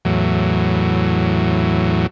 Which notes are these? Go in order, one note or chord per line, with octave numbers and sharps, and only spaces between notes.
E2 A2 F#3